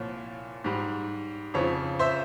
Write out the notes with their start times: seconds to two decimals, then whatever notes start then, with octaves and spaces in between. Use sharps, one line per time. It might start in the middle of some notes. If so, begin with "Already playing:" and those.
Already playing: C2 A#2 F3 C#5
0.64 G#2 G3
1.54 F2 C#3 F3 C#5
1.99 C5 E5